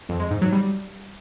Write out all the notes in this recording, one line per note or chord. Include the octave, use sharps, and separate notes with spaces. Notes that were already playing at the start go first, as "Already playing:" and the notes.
F2
G#3
G#2
F#3
G3